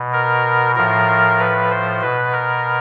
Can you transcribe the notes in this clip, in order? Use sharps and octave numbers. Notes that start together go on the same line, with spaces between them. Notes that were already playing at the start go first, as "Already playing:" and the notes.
Already playing: B2
A#4
A2 F3 A#4
B4
C5
B2 B4
A#4